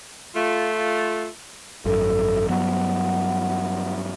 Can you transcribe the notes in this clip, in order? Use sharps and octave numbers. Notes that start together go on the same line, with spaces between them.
A3 F4
G#1 F#2 A4
G2 F#3 B3 F#5